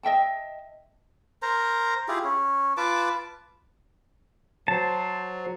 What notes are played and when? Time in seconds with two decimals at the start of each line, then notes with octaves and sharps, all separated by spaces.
0.03 D#5 E5 G5 A5
1.42 A#4 C5 A#5
2.08 E4 F4 G4 G#4
2.24 C#4
2.77 F4 B4 A5 D6
4.68 F#3 C5 A5